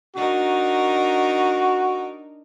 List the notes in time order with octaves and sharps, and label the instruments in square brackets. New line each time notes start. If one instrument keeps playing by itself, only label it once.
[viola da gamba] D4 D#4 A#4 [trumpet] F#4